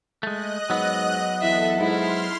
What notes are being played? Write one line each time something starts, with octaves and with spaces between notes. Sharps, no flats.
G#3 A3 D#5 F#6
G#2 F#3 B3
E2 A4 E5
G#2 E4 C6 F6